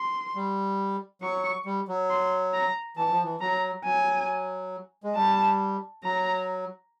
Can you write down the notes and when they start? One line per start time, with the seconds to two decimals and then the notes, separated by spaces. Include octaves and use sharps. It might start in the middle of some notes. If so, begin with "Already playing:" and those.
Already playing: C6
0.35 G3
1.22 F#3 C#6
1.65 G3
1.88 F#3
2.10 C6
2.54 A#5
2.97 E3 A5
3.10 F3
3.24 E3
3.41 F#3 A#5
3.85 F#3 G#5
5.04 G#3
5.16 G3 A5
6.04 F#3 A#5